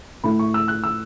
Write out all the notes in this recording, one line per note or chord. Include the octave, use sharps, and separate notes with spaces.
A2 A3 E4 B5
C#6
E6
F#6
E6